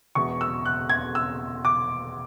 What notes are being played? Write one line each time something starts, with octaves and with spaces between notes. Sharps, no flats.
E1 E2 B2 C#6
E6
F#6
G#6
E6
D6